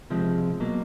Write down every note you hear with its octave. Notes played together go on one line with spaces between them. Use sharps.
C#2 C3 F3 G#3 C4
B2 F#3 A#3